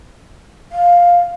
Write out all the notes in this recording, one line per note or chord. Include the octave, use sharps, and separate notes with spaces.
F5